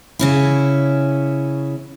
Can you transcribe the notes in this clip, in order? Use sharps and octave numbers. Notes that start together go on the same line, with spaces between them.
C#3 C#4 E4